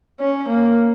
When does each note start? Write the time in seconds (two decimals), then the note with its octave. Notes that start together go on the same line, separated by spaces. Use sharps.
0.20 C#4
0.49 A#3